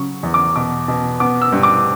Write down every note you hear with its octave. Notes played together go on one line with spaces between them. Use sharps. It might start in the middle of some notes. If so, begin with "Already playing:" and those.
Already playing: C#3 F#3 C#6
E2
D6
B2 D6
B2
B3 D6
E6
G2
D6